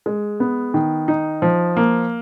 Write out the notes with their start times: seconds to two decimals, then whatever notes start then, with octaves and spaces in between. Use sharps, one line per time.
0.06 G#3
0.40 B3
0.74 D#3
1.08 D#4
1.42 F3
1.77 A#3